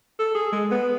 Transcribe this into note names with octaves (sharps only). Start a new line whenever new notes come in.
A4
G#4
G#3
B3